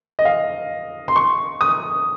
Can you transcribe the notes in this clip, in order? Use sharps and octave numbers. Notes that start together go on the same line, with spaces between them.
D#5
F5
C6
C#6
D#6